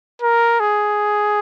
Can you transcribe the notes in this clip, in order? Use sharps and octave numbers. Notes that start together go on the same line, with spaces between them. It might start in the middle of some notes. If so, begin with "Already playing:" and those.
A#4
G#4